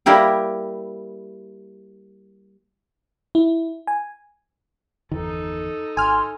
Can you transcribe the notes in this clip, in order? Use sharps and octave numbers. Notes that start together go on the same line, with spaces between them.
G3 A#3 E4 G4 A#4
E4
G#5
G1 E2 D#3 D#4 A4
G#1 G#5 C6 F6